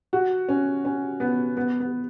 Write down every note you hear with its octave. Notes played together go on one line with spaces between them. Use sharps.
F#4
C#4
C#4
B3
B3
B3